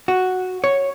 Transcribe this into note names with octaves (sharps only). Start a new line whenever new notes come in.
F#4
C#5